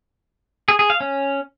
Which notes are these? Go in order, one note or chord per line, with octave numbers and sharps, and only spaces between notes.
G#4
G#4
F5
C#4